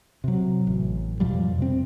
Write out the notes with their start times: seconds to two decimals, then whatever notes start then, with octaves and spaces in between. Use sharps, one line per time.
0.24 C3 F#3
0.67 A1
1.20 F2 B2 F3 G3
1.58 C3 C4